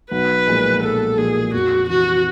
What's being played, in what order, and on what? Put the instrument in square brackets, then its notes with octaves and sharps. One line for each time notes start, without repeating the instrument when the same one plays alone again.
[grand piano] B1 [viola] B4
[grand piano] A#2 F3 G#3
[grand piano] B1 [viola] A4
[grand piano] A#2 F3 G#3 [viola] G#4
[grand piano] F2 [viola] F#4
[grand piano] C3 E3 [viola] F#4